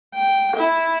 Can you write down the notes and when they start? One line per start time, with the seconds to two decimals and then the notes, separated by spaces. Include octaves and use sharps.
0.15 G5
0.57 E4